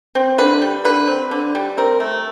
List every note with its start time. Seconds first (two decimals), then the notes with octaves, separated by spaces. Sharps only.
0.15 C4
0.38 D3 B4
0.62 G3
0.85 D3 B4
1.07 C4
1.31 D3
1.55 G3
1.77 C4 A#4
2.00 A3